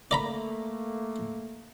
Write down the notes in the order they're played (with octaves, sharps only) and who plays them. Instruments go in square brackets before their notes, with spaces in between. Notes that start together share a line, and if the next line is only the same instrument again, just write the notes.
[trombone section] A3 A#3 [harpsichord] D5 A#5 B5